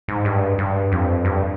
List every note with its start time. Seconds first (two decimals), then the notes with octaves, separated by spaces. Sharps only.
0.08 G#2
0.25 G2
0.58 G2
0.92 F2
1.25 G2